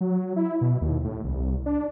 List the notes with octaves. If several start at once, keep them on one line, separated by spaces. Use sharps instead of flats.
F#3
E4
B2
D#2
A2
C2
D4